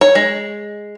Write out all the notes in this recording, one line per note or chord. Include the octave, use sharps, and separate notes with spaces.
C#5
G#3